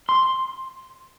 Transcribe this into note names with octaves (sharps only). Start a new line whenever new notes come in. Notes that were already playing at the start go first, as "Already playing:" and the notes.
C6